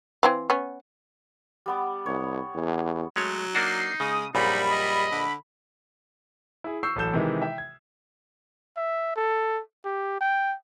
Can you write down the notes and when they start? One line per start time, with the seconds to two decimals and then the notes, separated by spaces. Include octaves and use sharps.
0.23 E3 C4 F5
0.50 B3 C#4
1.66 G3 B3 D6
2.06 C2 C#5
2.54 E2
3.16 F#3 G#3 A3 C#5
3.55 A#3 D4 D#4 F#4 C7
4.00 C#3 G#3 D#6
4.35 A#1 F#2 A#2 G3 D#4 B5
4.71 D#5
5.12 D3
6.64 E4 G#4
6.83 C#6 E6 G6 C7
6.96 A1 F#3 A4 G6 E7
7.13 C3 D#3 E3 G#3
7.42 E5 G5
7.58 G#6
8.77 E5
9.16 A4
9.85 G4
10.21 G5